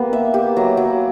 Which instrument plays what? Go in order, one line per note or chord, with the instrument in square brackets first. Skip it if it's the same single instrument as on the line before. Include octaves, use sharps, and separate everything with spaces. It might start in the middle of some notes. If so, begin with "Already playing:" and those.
Already playing: [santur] A#3 B3 G4
E5
G4
F#3
F#3